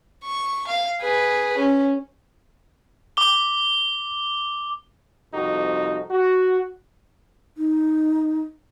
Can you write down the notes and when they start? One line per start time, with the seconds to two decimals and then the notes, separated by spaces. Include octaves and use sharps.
0.25 C#6
0.67 F5
1.01 G#4 B4
1.57 C#4
3.17 D6 G7
5.34 C2 F2 D#4 F#4
6.11 F#4
7.57 D#4